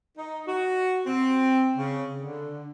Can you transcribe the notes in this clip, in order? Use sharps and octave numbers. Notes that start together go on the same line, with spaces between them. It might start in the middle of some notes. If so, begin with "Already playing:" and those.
D#4
F#4
C4
C#3
D3